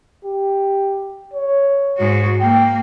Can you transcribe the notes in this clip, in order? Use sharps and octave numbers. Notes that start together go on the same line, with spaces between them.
G4
C#5
G#2 F#4
A#3 G5